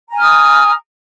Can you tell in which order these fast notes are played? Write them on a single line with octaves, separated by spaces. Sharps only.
A#5 G#5 F6 D#6